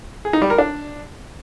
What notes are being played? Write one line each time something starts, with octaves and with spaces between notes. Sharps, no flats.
G#4
D#4
G3
A#4
D4